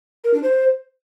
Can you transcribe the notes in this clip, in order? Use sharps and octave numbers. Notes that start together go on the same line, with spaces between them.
A#4
D4
C5